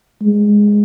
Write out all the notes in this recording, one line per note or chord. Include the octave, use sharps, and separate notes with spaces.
G#3